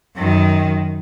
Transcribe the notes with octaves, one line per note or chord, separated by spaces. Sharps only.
F#2 D#3